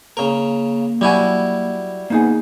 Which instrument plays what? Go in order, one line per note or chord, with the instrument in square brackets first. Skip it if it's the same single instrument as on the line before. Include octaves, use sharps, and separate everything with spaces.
[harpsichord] C#3 A#4 [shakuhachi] A#3
[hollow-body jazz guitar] F#3 G#5 [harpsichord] G3 E4 F#4
[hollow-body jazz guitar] A#3 D#4 G#4 [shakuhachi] B3